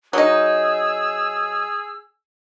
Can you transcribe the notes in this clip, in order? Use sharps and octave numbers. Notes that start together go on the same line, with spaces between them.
F#3 D#4 G#4 E6